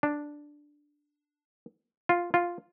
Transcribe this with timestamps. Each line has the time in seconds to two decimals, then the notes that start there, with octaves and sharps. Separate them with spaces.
0.03 D4
2.09 F4
2.34 F4